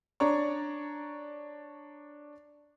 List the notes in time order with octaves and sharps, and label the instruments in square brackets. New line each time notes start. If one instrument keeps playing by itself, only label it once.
[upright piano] D4 C#5 D5 A#5 C#6